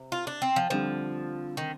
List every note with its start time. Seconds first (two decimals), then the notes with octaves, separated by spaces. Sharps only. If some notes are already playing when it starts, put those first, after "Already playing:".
Already playing: C3
0.12 F4
0.27 D4
0.42 C4
0.56 F3
0.70 D3 F3 G3 C4
1.57 D#3